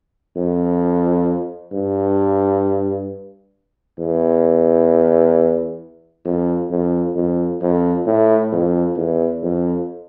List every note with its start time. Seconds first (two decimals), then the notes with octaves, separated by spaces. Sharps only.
0.37 F2
1.73 G2
3.99 E2
6.25 F2
6.71 F2
7.16 F2
7.61 F2
8.06 A2
8.52 F2
8.97 E2
9.42 F2